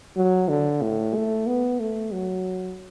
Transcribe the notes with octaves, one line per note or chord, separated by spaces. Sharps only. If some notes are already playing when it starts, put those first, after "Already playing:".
F#3
D3
A2
A3
B3
A3
F#3